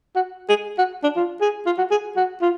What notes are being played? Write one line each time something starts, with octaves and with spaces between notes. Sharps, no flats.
F#4
G#4
F#4
D4
F4
G#4
F4
F#4
G#4
F#4
F4